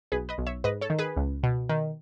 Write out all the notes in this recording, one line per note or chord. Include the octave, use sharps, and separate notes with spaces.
B1 G#4 B4
B4 D#5
B1
C#5 E5
G#2 B4 D#5
A4 C#5
D#3
G#4 B4
C#2
B2
D#3